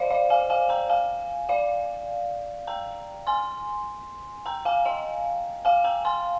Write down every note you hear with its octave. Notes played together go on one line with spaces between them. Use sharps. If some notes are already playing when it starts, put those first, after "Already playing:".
Already playing: C5 D5 D#5 F5
D5 F5
F5 G#5
F5 G#5
G5 A#5
F5 G#5
D5 F5
G5 A#5
G#5 C6
G5 A#5
F5 G#5
D#5 G5
F5 G#5
G5 A#5
G#5 C6